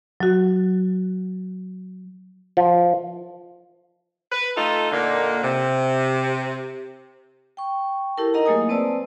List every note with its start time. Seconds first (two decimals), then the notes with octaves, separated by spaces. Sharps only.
0.20 F#3 F#4
2.57 F3
4.32 B4
4.57 A3 D#4 F4 A4
4.92 A#2 D3 A#3 D#4
5.44 C3
7.57 G5 C#6
8.17 E4 G4 A4 A#4 A5
8.34 D#4 A#4 D#5 F#5 A#5
8.46 F#3 A3 A#3 G#4 G#5 D#6
8.69 C4 B4 C5 D5 A5 E6